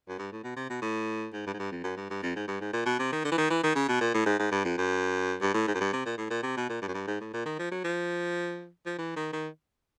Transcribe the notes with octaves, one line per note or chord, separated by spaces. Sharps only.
F#2
G2
A2
B2
C3
B2
A2
G#2
G2
G#2
G2
F2
F#2
G2
G2
F2
G#2
G2
G#2
A#2
B2
C3
D#3
D3
E3
D#3
E3
D#3
C#3
B2
A#2
A2
G#2
G#2
G2
F2
F#2
G2
A2
G#2
F#2
G2
C3
A#2
A2
A#2
C3
B2
A#2
G2
F#2
G2
G#2
A2
A#2
D#3
F3
F#3
F3
F3
E3
D#3
D#3